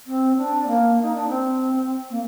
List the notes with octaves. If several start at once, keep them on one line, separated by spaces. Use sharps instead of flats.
C4
D4
A#3
D#4
D4
C4
A#3